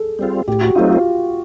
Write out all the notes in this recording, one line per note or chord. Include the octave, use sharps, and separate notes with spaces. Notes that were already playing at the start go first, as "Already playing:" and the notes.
Already playing: G#4 A4
G3 C4 F4 G#4
A2 G4
F#4
F#3 A3 C4 D#4 F4
F4